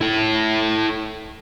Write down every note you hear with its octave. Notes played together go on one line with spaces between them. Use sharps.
E4 A4